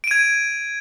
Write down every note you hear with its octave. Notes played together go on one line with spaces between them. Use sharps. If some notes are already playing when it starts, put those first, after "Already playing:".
G#6 D7 D#7